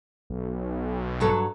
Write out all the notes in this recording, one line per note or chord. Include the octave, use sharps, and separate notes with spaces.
B1
G2 F#3 A4